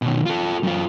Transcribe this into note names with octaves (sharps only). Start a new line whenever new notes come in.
B2 D#3
F4 A4
F#2 F4